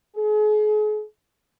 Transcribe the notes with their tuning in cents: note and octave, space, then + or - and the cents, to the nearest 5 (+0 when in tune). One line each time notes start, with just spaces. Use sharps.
G#4 +40